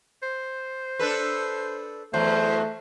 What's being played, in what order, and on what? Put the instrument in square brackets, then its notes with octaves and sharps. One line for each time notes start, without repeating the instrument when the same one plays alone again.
[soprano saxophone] C5
[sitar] D4 A4 B4
[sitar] E2 F#3 [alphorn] A3 [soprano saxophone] C5